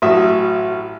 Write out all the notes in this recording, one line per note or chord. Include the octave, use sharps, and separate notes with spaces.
A1 F#3 E5 D#6